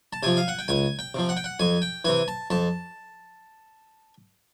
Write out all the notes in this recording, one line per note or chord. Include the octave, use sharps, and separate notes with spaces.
A5
C3 F3 G#5
F5
F#5
G5
C#2 G#5
G5
C3 F3
F#5
G5
F#5
F2 G#5
G5
C3 E3 G#5
A5
F2 A5